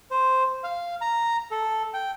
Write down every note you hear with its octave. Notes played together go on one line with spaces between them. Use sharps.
C5
F5
A#5
A4
G5